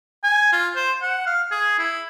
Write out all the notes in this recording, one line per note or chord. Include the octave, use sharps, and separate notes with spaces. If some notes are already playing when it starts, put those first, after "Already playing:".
G#5
F4
C5
F#5
F5
G#4
E4